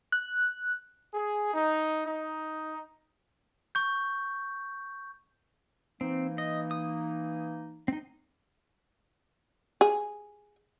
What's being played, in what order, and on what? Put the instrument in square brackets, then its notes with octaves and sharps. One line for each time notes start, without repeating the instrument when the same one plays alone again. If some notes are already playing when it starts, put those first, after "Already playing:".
[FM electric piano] F#6
[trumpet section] G#4
D#4
D#4
[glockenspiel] C#6 G6
[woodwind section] E3 A#3 D#4 [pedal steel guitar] C4
[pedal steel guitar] D#5
D#6
C4 D#4
[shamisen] G#4